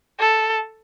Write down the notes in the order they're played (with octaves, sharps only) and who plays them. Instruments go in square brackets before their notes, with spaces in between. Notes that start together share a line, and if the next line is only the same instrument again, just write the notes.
[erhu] A4